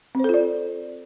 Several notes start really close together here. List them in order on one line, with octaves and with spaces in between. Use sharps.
C4 C5 A4 F4 D5